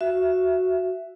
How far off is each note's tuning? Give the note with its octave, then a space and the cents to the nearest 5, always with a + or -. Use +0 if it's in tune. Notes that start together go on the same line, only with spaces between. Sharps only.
F#4 +0 E5 +10